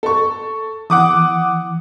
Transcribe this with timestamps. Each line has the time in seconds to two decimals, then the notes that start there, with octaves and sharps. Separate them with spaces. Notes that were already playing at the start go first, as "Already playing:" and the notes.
0.03 A4 C#6
0.90 E3 F#5 D6 D#6